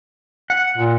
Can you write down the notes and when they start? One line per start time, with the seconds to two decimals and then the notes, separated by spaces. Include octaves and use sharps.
0.50 F#5
0.78 A#2